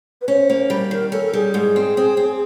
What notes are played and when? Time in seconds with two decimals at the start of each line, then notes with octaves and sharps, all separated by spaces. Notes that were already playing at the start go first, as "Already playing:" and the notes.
0.21 B4
0.28 C#4 C5
0.50 A#3
0.70 G3
0.91 D#3 A#4
1.12 C#4 A4
1.25 A4
1.33 G3 G#4
1.54 G#2 G#4
1.76 C4
1.97 C4
2.17 C4